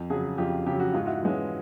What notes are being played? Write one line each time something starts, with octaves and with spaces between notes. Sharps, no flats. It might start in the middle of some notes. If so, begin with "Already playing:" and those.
Already playing: F2
C#3 F#3 F#4 G#4
F2 F4 G4
C#3 F#3 G4
F#4
G#2 F4
E4 F#4
E3 G#3 C#4